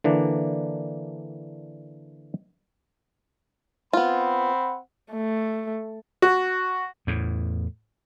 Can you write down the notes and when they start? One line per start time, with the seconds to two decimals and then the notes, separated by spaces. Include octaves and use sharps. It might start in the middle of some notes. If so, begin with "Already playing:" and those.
0.04 D3 E3 A#3 D4
3.93 B3 C4 F4 F#5 B5
5.12 A3
6.22 F#4
7.07 E2 A2